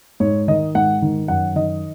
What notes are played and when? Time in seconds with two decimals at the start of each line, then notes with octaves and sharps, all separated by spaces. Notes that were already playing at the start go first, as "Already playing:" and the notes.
0.20 G#2 C#5
0.48 D#3 D#5
0.75 G#2 F#5
1.02 D#3
1.28 F#2 F#5
1.56 D#3 D#5